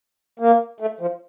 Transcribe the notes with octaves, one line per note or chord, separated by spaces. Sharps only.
A#3
A3
F3